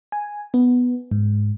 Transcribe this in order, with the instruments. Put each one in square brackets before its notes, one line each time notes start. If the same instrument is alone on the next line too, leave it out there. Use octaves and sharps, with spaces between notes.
[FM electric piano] G#5
B3
G#2